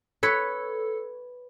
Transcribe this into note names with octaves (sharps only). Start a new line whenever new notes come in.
A4 B4 C#5